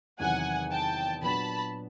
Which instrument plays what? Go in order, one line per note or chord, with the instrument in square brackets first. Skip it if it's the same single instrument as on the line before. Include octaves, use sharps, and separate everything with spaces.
[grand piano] E2 C3 D#3 F#3 [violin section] F#5 G#5
[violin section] G5 A5
[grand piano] A#2 F#3 B3 D4 F#4 [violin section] A5 B5